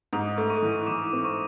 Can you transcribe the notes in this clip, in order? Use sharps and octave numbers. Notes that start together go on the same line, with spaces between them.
G#2 D#6
A3
C#6
E3
E3 D6
C4
C#6